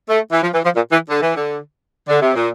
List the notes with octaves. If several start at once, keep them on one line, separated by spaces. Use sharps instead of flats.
A3
E3
F3
E3
F3
A#2
E3
D3
E3
D3
D3
C3
A#2